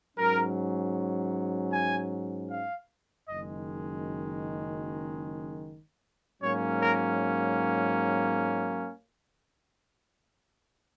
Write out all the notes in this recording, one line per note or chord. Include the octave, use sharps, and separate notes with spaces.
G#2 F#3 C#4 A#4
G#5
F5
F#1 F#2 D#3 G#3 D#5
G#2 F#3 A#3 C#4 C#5
A#4